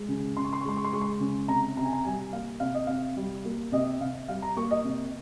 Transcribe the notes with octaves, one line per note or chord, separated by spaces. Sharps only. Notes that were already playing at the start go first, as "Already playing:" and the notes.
Already playing: G#3
C#3
C#3 C6
C#6
C6
C#6
G#3 C6
C#6
C6
G#3 C#6
C6
C#3
C3 A#5
C3 A#5
G#5
A#5
G3 G#5
A#3 F5
C3 F5
D#5
C3 F5
G3
A#3
C3 D#5
C3 F5
G3 F5
A#5
A#3 C#6
D#5
C3